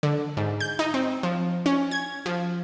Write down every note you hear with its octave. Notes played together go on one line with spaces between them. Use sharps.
D3
G#2
G6
D#4
C4
F3
C#4
G#6
F3